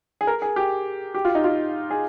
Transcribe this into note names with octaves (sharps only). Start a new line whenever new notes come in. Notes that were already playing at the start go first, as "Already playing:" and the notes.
G#4
A#4
G#4
G4
G4
F4
D#4
F4
G#4